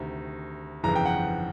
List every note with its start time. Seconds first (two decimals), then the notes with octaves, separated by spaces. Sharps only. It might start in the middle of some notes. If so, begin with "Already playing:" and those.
Already playing: D2 C3 D#3
0.83 G1 F2 C#3 E3 A#5
0.96 G5
1.05 F#5